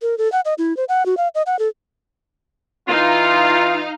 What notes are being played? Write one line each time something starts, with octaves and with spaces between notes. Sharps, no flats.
A#4
A4
F#5
D#5
E4
C5
F#5
F#4
F5
D#5
F#5
A4
E3 D#4 F4 F5 A#5